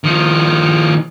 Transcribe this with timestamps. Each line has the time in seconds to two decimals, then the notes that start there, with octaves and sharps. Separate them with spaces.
0.04 D#3 F3